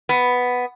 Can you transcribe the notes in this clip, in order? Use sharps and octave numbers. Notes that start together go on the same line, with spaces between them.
B3